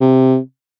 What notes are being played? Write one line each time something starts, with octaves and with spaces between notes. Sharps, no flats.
C3